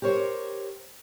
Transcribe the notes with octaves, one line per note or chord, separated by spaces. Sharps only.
G4 A#4 C5 C#5